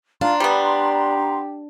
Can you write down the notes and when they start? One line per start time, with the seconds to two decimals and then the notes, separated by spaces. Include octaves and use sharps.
0.21 D4 F4 A#5 C6
0.40 G3 B3 G4